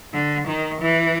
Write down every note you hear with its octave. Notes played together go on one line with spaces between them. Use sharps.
D3
D#3
E3